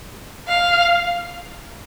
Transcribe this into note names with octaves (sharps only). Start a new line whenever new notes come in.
F5